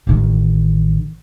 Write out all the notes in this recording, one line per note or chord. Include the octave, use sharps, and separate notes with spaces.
A1 D#3